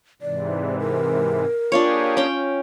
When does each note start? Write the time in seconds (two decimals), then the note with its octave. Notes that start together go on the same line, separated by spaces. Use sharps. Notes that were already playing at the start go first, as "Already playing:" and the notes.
0.22 G#2 C3 E3 D5
0.79 A#4
1.72 A#3 D4 F4 G4 G#4 C#5
2.17 C#4 G5